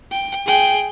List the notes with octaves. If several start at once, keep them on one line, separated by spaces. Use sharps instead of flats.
G5
G#4 G5